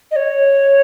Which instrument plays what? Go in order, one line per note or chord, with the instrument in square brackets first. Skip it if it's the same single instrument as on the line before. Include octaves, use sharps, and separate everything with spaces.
[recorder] D#5
C#5